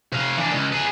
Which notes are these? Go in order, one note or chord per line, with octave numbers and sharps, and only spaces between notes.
C3 F5
E3 D4
C#2
G#4 B4